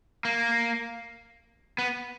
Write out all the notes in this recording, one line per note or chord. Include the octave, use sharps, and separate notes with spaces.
A#3
B3